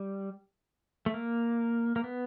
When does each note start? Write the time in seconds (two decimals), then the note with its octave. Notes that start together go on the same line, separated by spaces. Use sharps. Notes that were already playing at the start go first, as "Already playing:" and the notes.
Already playing: G3
1.06 A3
1.14 A#3
1.96 A#3
2.04 B3